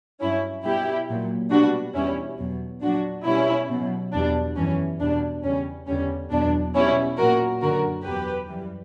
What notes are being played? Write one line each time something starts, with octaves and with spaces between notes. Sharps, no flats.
G2 F#3 C#4 E4
B2 G3 E4 G4
A#2 F#3
B2 G3 D4 F#4
E2 B2 G3 C#4 E4
E2 B2 F#3
A#2 F#3 D4 F#4
B2 G3 C#4 E4
B2 F#3
E2 B2 G3 D4
F#2 E3 G3 C#4
E2 B2 G3 D4
E2 C#3 G3 C#4
E2 D3 G3 C#4
E2 B2 F#3 D4
B2 G3 C#4 E4
A#2 F#3 F#4 A#4
F#2 D3 F#3 F#4 A#4
E2 B2 F#3 G4 B4
F#2 E3 G3